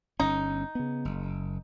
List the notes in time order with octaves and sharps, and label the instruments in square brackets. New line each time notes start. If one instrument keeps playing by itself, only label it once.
[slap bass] G1 C#4 [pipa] D#4
[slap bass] C#3 B3
F#1